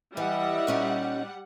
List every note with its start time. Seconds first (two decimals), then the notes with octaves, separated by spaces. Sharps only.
0.17 E3 G3 D#5 E5 F#5
0.67 A#2 C#4 D#4